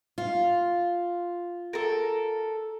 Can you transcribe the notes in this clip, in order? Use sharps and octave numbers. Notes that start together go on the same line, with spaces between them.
F4
A4 A#4